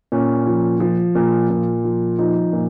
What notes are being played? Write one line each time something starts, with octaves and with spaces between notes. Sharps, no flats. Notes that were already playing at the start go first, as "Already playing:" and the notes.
A#2 C#4
F3
F3
A#2
A#2
F3
F3 D#4
A#2